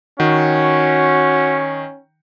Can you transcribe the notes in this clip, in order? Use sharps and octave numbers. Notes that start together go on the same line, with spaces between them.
D#3 C#4 F#4